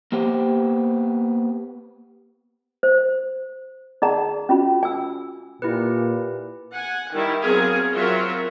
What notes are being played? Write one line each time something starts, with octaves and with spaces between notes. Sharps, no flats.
A#3 B3 G4 C5 G5
C5
D#4 G#4 D5 F#5 A#5
C#4 F4 F#4 B5
G#5 E6
A#2 E4 G4 B4
F#5 G#5
D#3 G3 E4
F#3 B3 C4 G#4 A#4 F5
F#3 C4 F4 F#4 A#4 E5